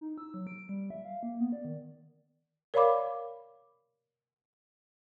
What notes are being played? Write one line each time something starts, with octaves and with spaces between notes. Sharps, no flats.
D#4
E6
F#3
D7
G3
E5
F5
A#3
B3
D5
D#3
A#4 C#5 D5 F5 B5 D6